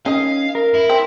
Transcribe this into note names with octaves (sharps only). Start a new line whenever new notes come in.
D#3 C#4 D#5 F5
A#4
E4
C4